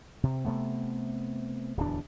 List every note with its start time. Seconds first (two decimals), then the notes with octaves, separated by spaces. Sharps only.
0.23 C3
0.45 C3 A3 B3
1.77 D1 E2 D4